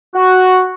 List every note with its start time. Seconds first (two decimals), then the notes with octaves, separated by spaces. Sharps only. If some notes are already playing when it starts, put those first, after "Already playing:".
0.15 F#4